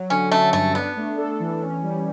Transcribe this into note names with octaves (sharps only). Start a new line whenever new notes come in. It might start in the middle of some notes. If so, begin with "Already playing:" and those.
Already playing: F#3
D3 C#4
A3 C#4
G2 A3
B3 D4
A3
A4
E3
C#4
G3